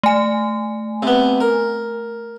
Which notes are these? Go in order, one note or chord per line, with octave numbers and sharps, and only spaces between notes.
A3 G#5
C3 B3
A#4